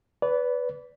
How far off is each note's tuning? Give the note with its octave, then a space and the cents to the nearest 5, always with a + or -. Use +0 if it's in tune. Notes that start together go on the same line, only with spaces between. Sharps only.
B4 +5 D5 -30